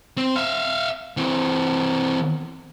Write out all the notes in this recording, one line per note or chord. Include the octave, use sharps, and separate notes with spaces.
C4
E5 F5
E3 C4